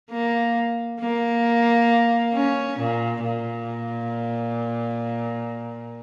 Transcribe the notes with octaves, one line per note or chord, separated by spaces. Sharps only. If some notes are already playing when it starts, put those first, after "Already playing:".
A#3
A#3
C#4
A#2
A#2